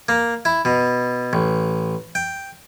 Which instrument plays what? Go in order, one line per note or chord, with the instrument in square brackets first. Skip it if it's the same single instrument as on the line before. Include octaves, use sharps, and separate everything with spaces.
[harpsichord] A#3
E4
B2
A1
G5